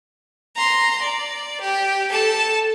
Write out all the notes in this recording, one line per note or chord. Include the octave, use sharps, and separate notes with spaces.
A#5 C6
D5
G4
A4 A5